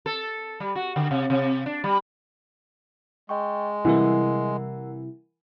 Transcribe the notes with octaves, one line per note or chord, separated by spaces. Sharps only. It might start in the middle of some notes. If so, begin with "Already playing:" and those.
A4
G3
F#4
D3
C3
C3
D4
G3
G#3 D#5 G5 C#6
C3 E3 G3 E4 A#4 F#5